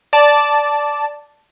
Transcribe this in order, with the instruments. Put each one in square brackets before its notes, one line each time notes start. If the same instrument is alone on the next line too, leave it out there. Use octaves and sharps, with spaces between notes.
[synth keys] D5 A5